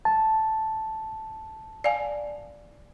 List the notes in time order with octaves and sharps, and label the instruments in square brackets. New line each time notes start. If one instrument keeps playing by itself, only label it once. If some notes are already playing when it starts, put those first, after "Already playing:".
[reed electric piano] A5
[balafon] D5 F5 G#5